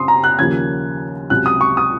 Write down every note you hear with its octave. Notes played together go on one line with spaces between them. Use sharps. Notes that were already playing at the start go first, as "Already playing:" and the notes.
Already playing: F#2 C#3 C4 C6 D#6
A#5
F#6
D#2 C#3 F3 A#3 G#6
C#2 C3 F#3 F#6
D#6
C#6
D#6